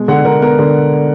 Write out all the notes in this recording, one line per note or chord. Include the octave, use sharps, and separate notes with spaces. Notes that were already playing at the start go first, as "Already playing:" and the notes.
Already playing: B2 G#3
D3 F#5
D3 A#4
B3 A#4
D3